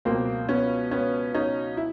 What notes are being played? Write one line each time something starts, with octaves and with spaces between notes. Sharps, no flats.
C#2 B2 F#3 A#3 C4
B3 C#4
B3 C#4
C#4 D#4
E4